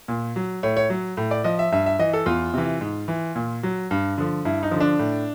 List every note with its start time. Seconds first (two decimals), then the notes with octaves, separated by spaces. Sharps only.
0.08 A#2
0.36 F#3
0.63 A2 C#5
0.77 C#5
0.90 F#3
1.17 A2
1.31 D5
1.44 F3 D#5
1.59 E5
1.72 G2 E5
1.86 E5
1.99 E3 D#5
2.13 A4
2.26 E2 F4
2.54 C3 E3
2.81 G#2
3.08 E3
3.36 A#2
3.63 F#3
3.91 G2
4.18 D3 F3
4.45 G2 E4
4.63 D#4
4.71 D3 F3
4.80 D4
4.99 A2